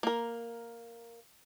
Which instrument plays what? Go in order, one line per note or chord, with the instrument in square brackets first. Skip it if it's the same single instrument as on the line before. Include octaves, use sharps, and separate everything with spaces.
[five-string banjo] A#3 A#4